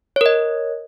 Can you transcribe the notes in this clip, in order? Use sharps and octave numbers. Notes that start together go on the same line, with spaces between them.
A#4 C#5 D#5